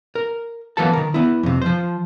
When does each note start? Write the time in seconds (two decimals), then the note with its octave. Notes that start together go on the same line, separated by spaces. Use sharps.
0.15 A#4
0.77 E3 F#3 A#3 B3 A4 A5
0.93 D#3 A#4
1.14 B3 E4
1.43 F2 C3
1.62 F3 C5